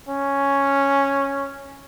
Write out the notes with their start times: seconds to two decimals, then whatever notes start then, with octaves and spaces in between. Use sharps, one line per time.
0.08 C#4